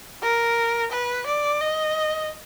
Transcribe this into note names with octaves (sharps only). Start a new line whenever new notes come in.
A#4
B4
D5
D#5